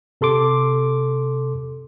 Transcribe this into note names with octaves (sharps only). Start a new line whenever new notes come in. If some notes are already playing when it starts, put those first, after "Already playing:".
C3 A4 C6 D6